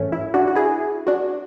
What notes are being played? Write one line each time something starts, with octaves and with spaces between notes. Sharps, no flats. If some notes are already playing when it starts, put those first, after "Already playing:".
Already playing: G#2 E3 A3 C#4
E4
D4 F#4
F#4
E4 G#4
D4 F#4